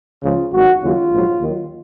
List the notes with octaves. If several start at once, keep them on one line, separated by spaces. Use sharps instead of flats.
C#2 C#3 F3 F4
G#1 F#2 D#3 F#4
D#2 C#3 F#3 F4
A#1 G#2 F#3
D#2 D#3 F#3